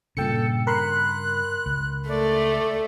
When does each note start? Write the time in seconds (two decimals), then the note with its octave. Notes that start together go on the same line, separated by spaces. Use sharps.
0.17 G2 A#2 C#3 A4 G5 C#7
0.67 A#4 B5 C6 F#6
1.66 C#2
2.09 A3 D5